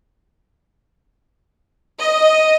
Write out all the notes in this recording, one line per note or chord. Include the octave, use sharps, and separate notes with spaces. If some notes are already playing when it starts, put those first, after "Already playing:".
D#5